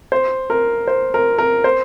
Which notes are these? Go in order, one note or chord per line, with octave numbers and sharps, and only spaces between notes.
C5
A#4
C5
A#4
A#4
C5